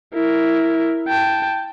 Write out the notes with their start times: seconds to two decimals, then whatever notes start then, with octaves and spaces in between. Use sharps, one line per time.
0.14 E4 A#4
1.08 G5 A5